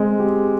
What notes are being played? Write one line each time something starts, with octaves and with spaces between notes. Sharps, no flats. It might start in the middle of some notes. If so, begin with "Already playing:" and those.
Already playing: G#3 C4
G4